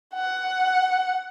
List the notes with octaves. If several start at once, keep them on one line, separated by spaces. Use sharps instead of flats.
F#5